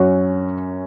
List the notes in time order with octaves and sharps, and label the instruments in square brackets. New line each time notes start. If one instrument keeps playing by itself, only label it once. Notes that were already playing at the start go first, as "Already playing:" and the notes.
Already playing: [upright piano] F#2 F#3 C#4 F#4